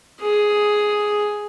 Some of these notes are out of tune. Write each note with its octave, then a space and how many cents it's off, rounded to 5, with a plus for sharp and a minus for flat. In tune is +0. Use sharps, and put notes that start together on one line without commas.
G#4 +5